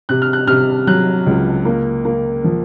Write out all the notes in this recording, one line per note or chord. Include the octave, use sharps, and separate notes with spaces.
C3 F#6
F6
F#6
C3 F6
F#3 F#6
C#2
A#3
A#3
F3